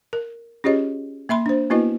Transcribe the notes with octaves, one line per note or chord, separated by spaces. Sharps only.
A#4
C#4 F4 G4 G#4 C#5 D#5
A#3 E5 B5 C6
D4 C5
A#3 B3 E4 F#4 B4 D#5